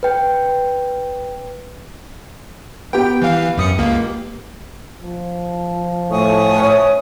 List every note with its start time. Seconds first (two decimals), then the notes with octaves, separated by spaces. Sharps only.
0.03 B4 G5
2.93 B3 G4 G5
3.22 E3 F5
3.58 F#2 D#6 C#7
3.78 C#2 A#3
5.01 F3
6.11 A2 G#5 C#6 D#6
6.54 C#4 B4 C#5